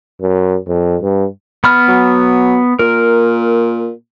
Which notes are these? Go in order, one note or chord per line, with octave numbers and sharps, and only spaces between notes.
F#2
F2
G2
B3 B5 F6
F#3
A#2 A#4